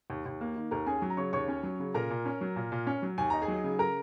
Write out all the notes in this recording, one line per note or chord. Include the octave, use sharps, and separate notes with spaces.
D#2
D#2
A#3
D#3
D#2 A#4 A#5
C#4 G#4 G#5
F#3
A#5
C#3 C#5 C#6
D#2 C#5 C#6
C#4
F#3
C#3
A#2 A#4 A#5
A#2
C#4
F#3
A#2
A#2
C#4
F#3
D#2 G#5
D#4 A#5
G#4 G#5
F#3
C#3
A#4 A#5